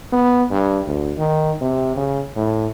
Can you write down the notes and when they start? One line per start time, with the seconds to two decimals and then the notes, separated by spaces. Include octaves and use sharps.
0.13 B3
0.50 G2
0.86 D2
1.18 D#3
1.61 C3
1.96 C#3
2.36 A2